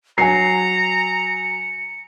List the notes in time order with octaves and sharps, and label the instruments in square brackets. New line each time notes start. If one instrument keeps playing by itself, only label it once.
[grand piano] F#3 [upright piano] G#5 C7 [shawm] A#5 [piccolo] C#7